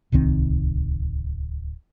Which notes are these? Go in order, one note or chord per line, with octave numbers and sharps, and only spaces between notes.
D1 C2 D#3 C4